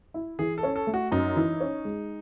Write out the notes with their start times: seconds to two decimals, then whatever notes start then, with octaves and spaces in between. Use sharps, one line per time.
0.14 E4
0.39 E3 G#4
0.58 A4
0.63 C#4
0.76 A4
0.87 A3
0.94 F#4
1.12 F#2 D#4
1.36 E3
1.60 C#4
1.85 G#3